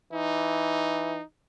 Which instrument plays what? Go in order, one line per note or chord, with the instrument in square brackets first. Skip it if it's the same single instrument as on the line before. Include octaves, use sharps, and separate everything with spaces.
[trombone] E3 [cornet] D#4